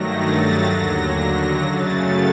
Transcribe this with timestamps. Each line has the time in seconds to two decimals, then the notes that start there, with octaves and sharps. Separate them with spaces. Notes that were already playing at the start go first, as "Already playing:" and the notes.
Already playing: G2 D#3 F#3 A3 A#6
0.14 A6
0.65 D#2 D3 F#3 A#6
1.63 F#2 C#3 F#3 A3 A6